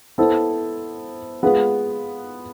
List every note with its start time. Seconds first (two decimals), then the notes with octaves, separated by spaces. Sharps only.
0.18 B3 E4 A4 C5
1.43 G#3 B3 F4 G#4 B4